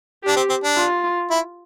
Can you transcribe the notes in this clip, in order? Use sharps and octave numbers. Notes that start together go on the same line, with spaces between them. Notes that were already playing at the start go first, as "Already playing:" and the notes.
D4 G4
C4
C4
D4
F4
E4